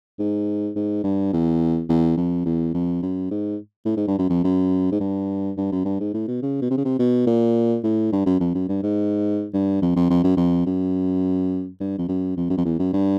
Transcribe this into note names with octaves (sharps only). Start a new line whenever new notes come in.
G#2
G#2
G2
E2
E2
F2
E2
F2
F#2
G#2
A2
G#2
G2
F#2
F2
F#2
G#2
G2
G2
F#2
G2
G#2
A2
B2
C#3
B2
C3
C#3
C3
B2
A#2
A2
G2
F#2
F2
F#2
G2
G#2
G2
F2
F2
F2
F#2
F2
F#2
G2
F2
F#2
F2
F#2
F2
E2
F#2
G2